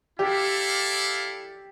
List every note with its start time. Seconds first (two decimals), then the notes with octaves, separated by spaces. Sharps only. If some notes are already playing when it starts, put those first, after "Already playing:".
0.19 E4 G4 A4 D5 F5